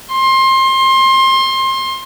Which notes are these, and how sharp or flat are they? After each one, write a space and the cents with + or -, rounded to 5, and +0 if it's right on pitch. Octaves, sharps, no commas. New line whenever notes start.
C6 +25